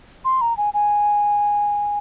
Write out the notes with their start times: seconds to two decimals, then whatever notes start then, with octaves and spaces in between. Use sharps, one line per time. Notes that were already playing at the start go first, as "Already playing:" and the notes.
0.25 C6
0.41 A#5
0.57 G#5
0.74 G#5